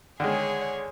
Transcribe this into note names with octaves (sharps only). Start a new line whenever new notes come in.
D3 D#3 G#3 G#4 C#5